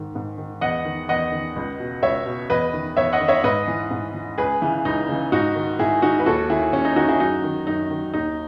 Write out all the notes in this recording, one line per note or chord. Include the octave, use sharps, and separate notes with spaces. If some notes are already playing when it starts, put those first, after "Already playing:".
Already playing: G#2 D#3
G#2
D#3
E2 D#5 F#5
D#3
E2 D#5 F#5
D#3
C#2
B2
C#2 C#5 E5
B2
E2 B4 D#5
D#3
E2 C#5 E5
D#5 F#5
D#3
C#5 E5
G#2 B4 D#5
E3
G#2
E3
C#2 G#4 B4
C#3 E3
C#2 D#4
C#3 E3
G#2 D#4 F#4
D#3
G#2 E4 G#4
D#3 D#4 F#4
B4
D#2 F#4 A4
D#3 E4 G#4
D#2 C#4
D#4
D#3 D#4 F#4
E4 G#4
F#2 D#4 F#4
D#3
F#2 D#4
D#3
D#2 D#4